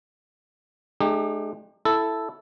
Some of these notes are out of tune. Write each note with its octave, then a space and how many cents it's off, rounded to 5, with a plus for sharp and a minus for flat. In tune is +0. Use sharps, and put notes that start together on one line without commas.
A3 -45 D#4 -45 G4 +30
E4 +0 A4 +0